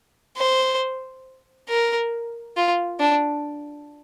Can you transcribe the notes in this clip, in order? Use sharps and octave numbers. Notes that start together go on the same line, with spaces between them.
C5
A#4
F4
D4